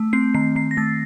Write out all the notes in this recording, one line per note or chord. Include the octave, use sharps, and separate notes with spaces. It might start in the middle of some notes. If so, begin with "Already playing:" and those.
Already playing: A3
C4 C7
D#3 C7
D#3 C7
A#6
A3 A6